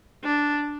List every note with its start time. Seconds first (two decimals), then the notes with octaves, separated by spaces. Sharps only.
0.24 D4